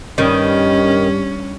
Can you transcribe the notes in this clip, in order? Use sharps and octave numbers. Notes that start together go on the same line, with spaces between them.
G2 D#3 C#4